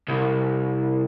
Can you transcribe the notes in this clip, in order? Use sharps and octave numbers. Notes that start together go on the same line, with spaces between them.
C2